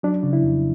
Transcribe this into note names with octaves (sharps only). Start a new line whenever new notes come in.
F#3 D4
C#3
E4
F2